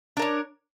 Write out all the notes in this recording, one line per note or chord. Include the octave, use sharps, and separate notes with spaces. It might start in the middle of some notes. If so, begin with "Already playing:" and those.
D4 A#4 C#5